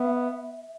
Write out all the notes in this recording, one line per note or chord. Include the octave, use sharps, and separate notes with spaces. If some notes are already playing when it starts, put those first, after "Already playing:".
Already playing: B3 E5